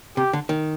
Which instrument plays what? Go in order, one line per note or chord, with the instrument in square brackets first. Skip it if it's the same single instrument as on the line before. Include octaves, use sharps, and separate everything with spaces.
[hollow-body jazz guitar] C3 [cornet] G4
[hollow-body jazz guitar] D3
D#3